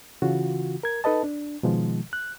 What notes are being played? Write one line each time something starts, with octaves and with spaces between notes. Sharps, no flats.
C#3 E3 F4 F#4
A#4 G#6
D#4 A4 B4 D#5 A5
D4
B2 D#3 F3 G#3
F#6